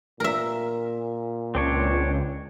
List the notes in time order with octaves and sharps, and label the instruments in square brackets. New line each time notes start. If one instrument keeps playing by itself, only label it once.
[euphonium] A#2 [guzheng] A#4 E5
[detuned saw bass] C#2 [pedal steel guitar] C4 D4 C#5